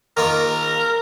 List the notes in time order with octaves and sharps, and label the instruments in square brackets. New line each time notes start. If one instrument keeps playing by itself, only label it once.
[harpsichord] D#3 A#3 F4 [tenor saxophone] A#4